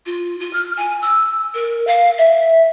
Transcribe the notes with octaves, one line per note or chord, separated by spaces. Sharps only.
F4
F4
F6
G#5
E6
A#4
F5
E5